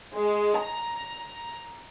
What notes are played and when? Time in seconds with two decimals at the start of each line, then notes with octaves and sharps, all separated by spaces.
0.15 G#3
0.60 A#5